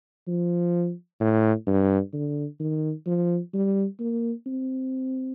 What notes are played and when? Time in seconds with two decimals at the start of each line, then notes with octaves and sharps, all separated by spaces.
0.27 F3
1.20 A2
1.67 G2
2.13 D3
2.60 D#3
3.06 F3
3.53 G3
3.99 A#3
4.46 C4